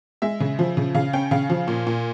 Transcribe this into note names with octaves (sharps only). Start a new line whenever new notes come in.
G#3 E5
C#3
F3
C#3
C#3 F5
C#4 G5
C#3 F5
F3
A#2
A#2